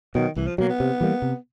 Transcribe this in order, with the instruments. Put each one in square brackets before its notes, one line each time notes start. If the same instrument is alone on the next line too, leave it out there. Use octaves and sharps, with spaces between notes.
[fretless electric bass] B2 F#3 [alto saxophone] D#3
[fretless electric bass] C2 [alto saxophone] E3
[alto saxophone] F3
[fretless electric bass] B2 F#3 [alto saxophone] A#3
[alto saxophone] B3
[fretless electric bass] C3
E3 G3 A#3
C3